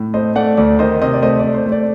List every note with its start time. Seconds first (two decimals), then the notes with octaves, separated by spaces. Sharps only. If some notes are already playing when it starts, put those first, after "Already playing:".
Already playing: A2
0.14 A3 C5 D#5
0.35 A3 D5 F#5
0.57 D2 D5
0.79 D#3 C5 D#5
1.02 C3 C5 D#5
1.14 D5
1.22 A3 C5 D#5
1.39 A3 D5
1.54 C5
1.66 A3
1.72 D5